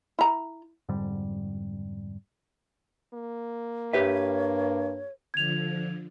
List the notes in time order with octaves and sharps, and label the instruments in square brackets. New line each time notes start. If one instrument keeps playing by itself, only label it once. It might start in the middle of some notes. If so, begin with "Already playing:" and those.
[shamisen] E4 A#5
[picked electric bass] F2 G#2 D3 G3
[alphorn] A#3
[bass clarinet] G2 [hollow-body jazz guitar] G4 B4 E5 [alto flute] C#5
[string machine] D3 F3 [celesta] G#6 F7